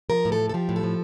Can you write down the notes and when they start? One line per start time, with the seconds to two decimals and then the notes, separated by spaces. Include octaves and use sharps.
0.10 F3 A#4
0.25 A2
0.32 A4
0.40 F3
0.49 A4
0.54 F3 G4
0.69 A2
0.76 A4
0.83 F3